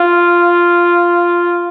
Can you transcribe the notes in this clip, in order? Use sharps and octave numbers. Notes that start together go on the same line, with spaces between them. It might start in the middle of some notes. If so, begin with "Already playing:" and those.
Already playing: F4